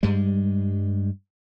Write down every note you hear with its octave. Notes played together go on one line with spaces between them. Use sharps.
G2 G3 G#3